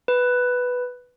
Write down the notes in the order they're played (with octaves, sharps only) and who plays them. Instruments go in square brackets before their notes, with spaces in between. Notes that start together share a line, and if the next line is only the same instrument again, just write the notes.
[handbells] B4